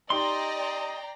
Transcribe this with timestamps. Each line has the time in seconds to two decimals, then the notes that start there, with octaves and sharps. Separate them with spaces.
0.10 D#4 G4 D5 D#5 G5 A#5 C6